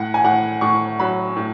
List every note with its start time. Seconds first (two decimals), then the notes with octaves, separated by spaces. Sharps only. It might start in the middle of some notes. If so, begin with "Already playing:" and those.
Already playing: A2 F#5
0.14 G#5
0.24 A2 F#5
0.61 A2 C#6
0.99 F#3 B5
1.36 A2